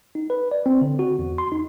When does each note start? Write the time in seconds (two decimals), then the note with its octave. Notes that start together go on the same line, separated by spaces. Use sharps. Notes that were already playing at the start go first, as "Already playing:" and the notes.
0.15 D#4
0.30 B4
0.51 D5
0.66 C4
0.81 D3
0.99 F#4
1.19 E2
1.38 C6
1.52 D#4